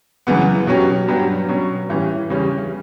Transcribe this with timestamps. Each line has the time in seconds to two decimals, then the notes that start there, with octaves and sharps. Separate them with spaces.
0.27 F#2 C#3 E3 B3
0.67 B2 F#3 C#4 G4
1.08 G2 F#3 B3 D4 G4
1.48 B2 F#3 C#4
1.89 A2 E3 G3 C#4
2.30 E2 C#3 G3 C#4